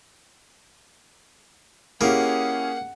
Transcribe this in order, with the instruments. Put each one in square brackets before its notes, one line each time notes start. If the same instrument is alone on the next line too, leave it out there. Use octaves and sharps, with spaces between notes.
[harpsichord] A#3 [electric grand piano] C#4 G#4 [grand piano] E4 G4 [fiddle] F#5